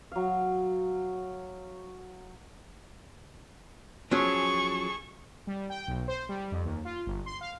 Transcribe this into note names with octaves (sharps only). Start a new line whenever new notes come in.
F#3 F5
F3 F#3 C#4 G#4 A4 C#6
G3
G5
B1
C5
G3
F2
D#2
F4
G1
C6
F5